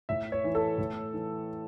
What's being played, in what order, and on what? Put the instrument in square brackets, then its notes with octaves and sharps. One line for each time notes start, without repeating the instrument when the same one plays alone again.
[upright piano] A2 E5
C#5
E3
A4
A2
E3